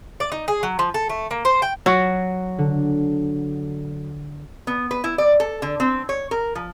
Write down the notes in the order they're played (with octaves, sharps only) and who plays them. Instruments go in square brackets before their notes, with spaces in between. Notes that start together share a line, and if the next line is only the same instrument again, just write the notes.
[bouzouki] D5
D#4
G#4
F#3
F3
A4
A3
A#3
C5
G5
[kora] F#3 F#4
[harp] D3
[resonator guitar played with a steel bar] B3
B4
E4
D5
A4
D3
C4
C#5
A#4
F3